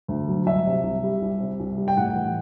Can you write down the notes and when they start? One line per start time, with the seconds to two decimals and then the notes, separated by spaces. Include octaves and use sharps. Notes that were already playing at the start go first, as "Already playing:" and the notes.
0.08 D2
0.28 F#3
0.46 C2 E5
0.66 C3
0.83 C2
1.03 G3
1.22 C2
1.40 C3
1.60 C2
1.77 G3
1.88 G5
1.97 A2 F#5
2.16 E3